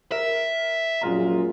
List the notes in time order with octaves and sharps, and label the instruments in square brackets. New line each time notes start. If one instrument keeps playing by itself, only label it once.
[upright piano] A#4 [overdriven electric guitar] E5
[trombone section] A#1 F#2 A#2 [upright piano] G#3 F4 A#5